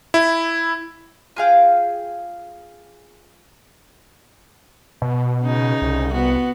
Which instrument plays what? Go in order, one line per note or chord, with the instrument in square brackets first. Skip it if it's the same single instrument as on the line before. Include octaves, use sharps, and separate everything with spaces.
[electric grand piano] E4
[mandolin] F4 G#4 F5 G5
[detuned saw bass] B2
[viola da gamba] C#3 D#4
[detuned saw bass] C2
[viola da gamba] B3 F#4